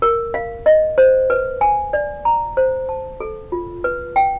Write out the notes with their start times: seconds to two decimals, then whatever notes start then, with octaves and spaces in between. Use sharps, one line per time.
0.02 A#4
0.34 F5
0.66 D#5
0.98 C5
1.30 B4
1.61 G#5
1.93 D5
2.25 A#5
2.57 C5
2.89 A5
3.20 A4
3.52 F4
3.84 B4
4.16 G5